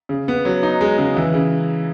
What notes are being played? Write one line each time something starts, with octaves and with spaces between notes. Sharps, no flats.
C#3
B3
F#3
D#4
G#3
C#3
E3
C#3